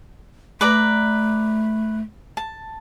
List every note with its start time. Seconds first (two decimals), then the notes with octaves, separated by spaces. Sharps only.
0.61 A3 B4 D5 A#5
2.37 A5